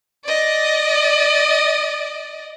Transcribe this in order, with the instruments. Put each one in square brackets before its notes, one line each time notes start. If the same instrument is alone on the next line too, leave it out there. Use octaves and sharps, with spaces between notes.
[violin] D5 D#5